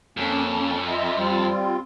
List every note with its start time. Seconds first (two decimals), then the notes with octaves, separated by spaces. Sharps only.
0.17 F2 A#3 C#4
0.88 F4 D#5 E5
1.17 G3 C4 F4